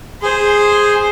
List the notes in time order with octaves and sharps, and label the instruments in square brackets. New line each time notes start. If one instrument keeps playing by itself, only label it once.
[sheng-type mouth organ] G#4 [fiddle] C5